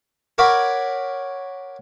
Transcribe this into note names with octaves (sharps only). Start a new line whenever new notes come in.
A#4 C#5 D5 F#5 B5